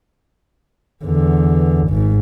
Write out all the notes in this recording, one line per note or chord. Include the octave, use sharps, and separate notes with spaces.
E2 D3
G#1 G#2